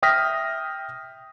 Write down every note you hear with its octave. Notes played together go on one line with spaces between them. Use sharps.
E5 G5 D#6 F6 A#6 B6